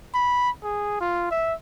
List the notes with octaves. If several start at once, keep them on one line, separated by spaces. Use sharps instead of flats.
B5
G#4
F4
E5